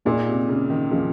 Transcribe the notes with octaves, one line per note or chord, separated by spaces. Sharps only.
A#2 A#3 D#4 G#4
C3
C#3
D#3
F3 A#3 D#4 G#4